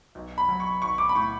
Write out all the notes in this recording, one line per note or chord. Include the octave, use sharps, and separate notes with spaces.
B1
B5
F#3
C#6
B1 C#6
D6
B5
A2 C#6